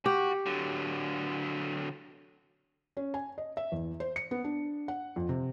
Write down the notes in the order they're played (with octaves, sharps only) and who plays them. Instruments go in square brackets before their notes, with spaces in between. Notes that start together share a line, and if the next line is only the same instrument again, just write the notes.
[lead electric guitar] F#4 [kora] G4
[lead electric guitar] D3 F#3
[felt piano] C#4
G#5
D#5
E5
E2
C5
C#7
B3
D4
F#5
F2
C3